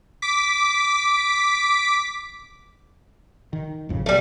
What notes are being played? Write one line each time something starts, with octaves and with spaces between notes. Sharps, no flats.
D6 B6
D#3
G#1 F2 C#3
B2 F#3 G3 A3